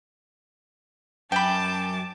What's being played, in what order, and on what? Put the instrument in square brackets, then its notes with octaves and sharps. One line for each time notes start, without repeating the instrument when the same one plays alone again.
[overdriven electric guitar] F#2 [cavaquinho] G5 B5 [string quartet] A5 D6